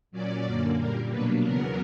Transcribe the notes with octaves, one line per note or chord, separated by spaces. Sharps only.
A#2 F#3 C#4 D5
F#2 D3 A#3 D5
A#2 G3 A#3 A#4
B2 F#3 A#3 D4 B4
E2 C#3 F#3 B3 A#4